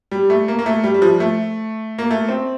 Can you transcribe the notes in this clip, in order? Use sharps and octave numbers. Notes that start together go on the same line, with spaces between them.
G3
A3
A#3
A#3
A3
G3
G3
F3
A3
A#3
A3
C4